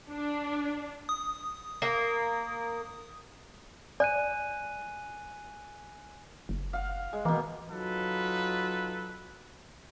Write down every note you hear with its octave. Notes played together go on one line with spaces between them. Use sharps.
D4
D#6
A#3
D5 G#5 F#6 D#7
F#1
F5 F#5
G#3
B2 E3 A#3
F#3 D#4 F4 F#4 A4 B4